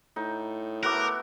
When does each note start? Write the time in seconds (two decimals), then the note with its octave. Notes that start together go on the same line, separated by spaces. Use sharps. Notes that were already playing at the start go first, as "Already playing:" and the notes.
0.16 A2 D#4
0.83 A3 B3 F#4 A#4 D6 F#6